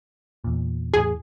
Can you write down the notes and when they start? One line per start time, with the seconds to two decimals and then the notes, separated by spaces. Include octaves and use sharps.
0.44 E2 A#2
0.94 E2 A2 G#4